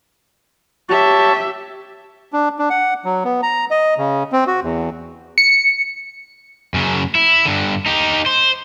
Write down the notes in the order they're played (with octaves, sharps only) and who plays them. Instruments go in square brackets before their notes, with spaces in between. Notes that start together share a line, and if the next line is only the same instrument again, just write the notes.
[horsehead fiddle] G4 E5 [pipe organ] C#5 A5
[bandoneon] D4
D4
F#5
F#3
B3
A#5
D#5
C#3
C4
F#4
E2
[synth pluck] C#7
[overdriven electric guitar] F#2 C#3
E4
G2 D3
D#4 G4
C5